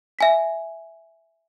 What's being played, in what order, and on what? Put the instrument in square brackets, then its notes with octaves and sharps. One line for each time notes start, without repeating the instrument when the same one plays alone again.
[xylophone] E5 G#5 B6